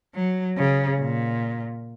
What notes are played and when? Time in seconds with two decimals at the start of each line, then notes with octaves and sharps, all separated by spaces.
0.15 F#3
0.57 C#3
1.00 A#2